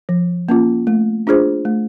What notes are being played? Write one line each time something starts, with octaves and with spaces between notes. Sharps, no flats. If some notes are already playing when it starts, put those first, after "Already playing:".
F3
A#3 C#4 F4
A3
D4 F4 G#4 C5
A3